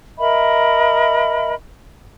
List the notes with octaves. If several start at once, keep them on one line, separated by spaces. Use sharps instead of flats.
A#4 D#5 E5 B5